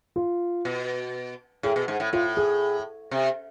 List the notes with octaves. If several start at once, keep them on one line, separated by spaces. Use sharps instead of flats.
F4
B2
A2 G#4
B2
G#2
A2
A2 F4
G#4
C3